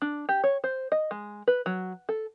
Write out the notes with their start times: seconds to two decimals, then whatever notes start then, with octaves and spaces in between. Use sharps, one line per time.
0.02 D4
0.29 G4
0.44 C#5
0.64 C5
0.92 D#5
1.11 G#3
1.48 B4
1.66 F#3
2.09 A4